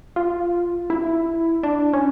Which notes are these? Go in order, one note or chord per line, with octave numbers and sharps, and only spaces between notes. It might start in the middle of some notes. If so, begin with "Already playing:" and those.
F4
E4
D4
C#4